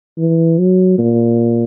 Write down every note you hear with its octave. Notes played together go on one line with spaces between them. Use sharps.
E3
F#3
A#2